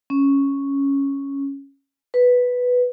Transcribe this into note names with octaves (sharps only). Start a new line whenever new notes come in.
C#4
B4